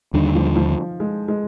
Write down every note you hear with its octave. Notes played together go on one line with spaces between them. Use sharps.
D#2 D3 D#3 G3 D4
F3
F3
G#3
G#3